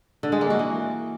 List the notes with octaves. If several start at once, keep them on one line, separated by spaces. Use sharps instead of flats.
D3
G#3
A#3
F#4
E3